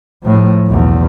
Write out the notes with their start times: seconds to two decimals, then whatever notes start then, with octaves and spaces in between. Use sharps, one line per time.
0.23 A2 F3
0.67 B1 E2